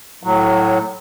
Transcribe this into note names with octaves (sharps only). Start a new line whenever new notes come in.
A2 F#3